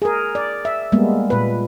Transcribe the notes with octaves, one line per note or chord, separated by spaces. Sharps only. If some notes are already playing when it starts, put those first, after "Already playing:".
G#4 A#4
D5
E5
G3 G#3 A#3 B3
A#2 B4